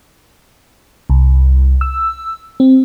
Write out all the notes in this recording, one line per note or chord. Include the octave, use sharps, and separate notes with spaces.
C2
E6
C4